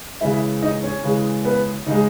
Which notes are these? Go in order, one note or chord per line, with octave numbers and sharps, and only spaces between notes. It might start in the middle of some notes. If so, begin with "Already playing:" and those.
C#3 E3 G#3 E4 E5
D#4 D#5
C#4 C#5
C#3 E3 G#3
B3 B4
C#3 G#3 D#4 D#5